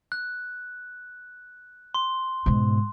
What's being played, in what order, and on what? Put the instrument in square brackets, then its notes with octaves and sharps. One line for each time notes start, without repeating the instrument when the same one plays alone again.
[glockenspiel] F#6
C6
[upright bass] G#2 B2